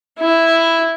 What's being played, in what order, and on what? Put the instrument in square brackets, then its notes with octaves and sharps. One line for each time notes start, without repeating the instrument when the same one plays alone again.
[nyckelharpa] E4